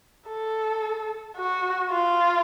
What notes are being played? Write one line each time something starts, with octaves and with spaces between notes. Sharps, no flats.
A4
F#4
F4